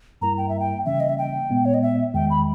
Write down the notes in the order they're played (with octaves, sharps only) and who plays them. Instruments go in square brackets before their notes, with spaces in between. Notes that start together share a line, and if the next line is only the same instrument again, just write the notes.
[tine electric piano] G2 G3 A#3 E4 A#4 [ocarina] A#5
[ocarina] G5
E5
G5
[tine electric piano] C#3 E3 G3 A#3 C#4 [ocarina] E5
[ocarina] D#5
E5
G5
[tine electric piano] A#2 G#3 B3
[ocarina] C#5
D#5
E5
[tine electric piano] E2 D#3 G#3 [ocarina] G5
[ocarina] B5